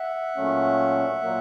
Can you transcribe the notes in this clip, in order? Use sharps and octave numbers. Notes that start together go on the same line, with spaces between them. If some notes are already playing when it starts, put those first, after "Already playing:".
Already playing: E5 F#5
A#2 F#3 A3 C#4
A#2 F#3 A#3